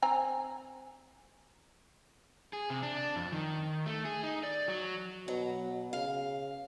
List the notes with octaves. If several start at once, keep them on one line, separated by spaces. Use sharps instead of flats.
C4 G#5 A#5
G#4
C3
D4
F2
D#3
A3
G#4
D#4
D5
F#3
B2 F#3
C#3 F5